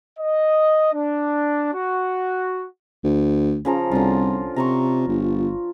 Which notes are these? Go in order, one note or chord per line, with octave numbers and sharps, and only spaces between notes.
D#5
D4
F#4
D2
C#3 F3 A#5
C2 D3 F4
C3 A#5 C6 C#6
G1